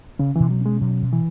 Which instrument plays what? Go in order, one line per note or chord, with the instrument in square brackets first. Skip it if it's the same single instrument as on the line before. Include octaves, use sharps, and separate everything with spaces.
[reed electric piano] C#3 [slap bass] C#4
[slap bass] B2 [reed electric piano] E3
[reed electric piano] F#3
[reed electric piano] G#3 [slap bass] C#4
[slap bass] B2 [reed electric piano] F#3
[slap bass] B2
[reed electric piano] E3